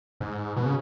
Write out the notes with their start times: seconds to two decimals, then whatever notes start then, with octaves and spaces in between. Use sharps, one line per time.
0.20 G#2
0.56 B2
0.66 C#3